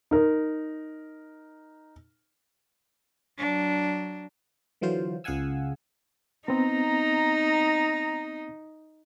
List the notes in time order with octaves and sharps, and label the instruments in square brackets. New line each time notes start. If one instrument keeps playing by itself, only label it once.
[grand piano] D#4 A#4
[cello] F#3 D4
[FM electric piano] D3 E3 F#3 F4 C5
C#2 G#4 F5 F#5 G#5 E6
[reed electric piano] B3 C4 [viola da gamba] D#4 [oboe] A#5